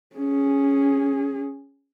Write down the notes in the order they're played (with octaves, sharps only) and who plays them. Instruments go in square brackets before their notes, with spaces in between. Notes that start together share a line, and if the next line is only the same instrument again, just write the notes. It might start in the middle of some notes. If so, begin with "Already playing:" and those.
[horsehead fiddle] C#4 G#4